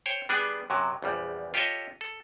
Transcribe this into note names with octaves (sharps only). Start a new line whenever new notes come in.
C5 C#5 G5
G3 B3 D4 G#4
F#2 C3 F#3
A#1 E2 G3
F4 G4 A4 C#5 D#5 E5
A4